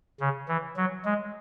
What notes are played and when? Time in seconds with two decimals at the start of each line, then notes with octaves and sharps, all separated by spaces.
0.20 C#3
0.48 E3
0.77 F#3
1.05 G#3